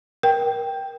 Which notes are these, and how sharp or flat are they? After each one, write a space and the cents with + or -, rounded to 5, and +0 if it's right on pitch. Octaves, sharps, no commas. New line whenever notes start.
A#4 +15 G5 +0